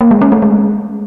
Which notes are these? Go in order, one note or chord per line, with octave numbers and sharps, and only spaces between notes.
A#3
G#3
C#4
A3
G#3